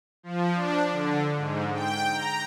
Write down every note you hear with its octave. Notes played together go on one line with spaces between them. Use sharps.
F3
D4
D3
G#2
G5
A#5